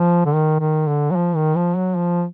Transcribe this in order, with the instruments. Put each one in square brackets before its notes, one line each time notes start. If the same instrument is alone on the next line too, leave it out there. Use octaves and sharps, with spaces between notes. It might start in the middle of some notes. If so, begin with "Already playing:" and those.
Already playing: [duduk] F3
D3
D#3
D#3
D3
F#3
F3
D#3
F3
F#3
F3